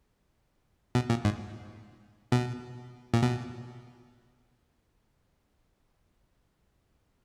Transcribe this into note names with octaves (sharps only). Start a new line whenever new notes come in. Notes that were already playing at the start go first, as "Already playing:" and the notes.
B2
A#2
G#2
B2
A#2
B2